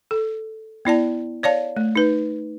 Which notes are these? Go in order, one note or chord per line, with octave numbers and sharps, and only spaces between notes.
A4
B3 E4 D5 A5
C#5 D5 F5 A5
A3
D#4 B4